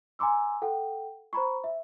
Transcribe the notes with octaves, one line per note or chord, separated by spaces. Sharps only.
G#5 A#5 C6 D6 E6
A4 F#5 G5
C5 A#5 B5 C#6
E5